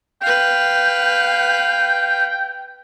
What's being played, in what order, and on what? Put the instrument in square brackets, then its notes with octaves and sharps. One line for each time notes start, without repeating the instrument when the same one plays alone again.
[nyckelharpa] B4 F5 [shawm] G5